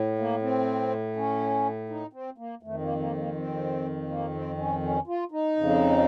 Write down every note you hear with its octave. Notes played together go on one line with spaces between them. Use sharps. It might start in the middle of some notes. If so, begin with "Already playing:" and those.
Already playing: A2
A#3
C4
C#4
D#4
C4
A#3
F2 D#3 A3
A#3
A#3
A#3
C4
A#3
C4
C#4
C#4
F4
D#4
F2 C#3